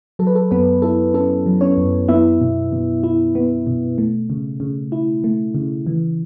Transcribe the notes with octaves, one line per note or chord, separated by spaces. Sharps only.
F#3 A4
B4
A4
F#2 B3 B4
E4 A4
C#4 A4
F#3
C#4 C#5
F#2
B3 E4 E5
B2
B2
E4
B3
B2
A3
C#3
C#3
E4
A3
C#3
E3